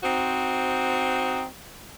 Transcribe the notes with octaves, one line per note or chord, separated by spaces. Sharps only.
C4 D#4 F#4 C5